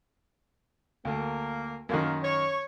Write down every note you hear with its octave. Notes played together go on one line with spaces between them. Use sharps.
D2 A#3
F#2 D#3 A#3
C#5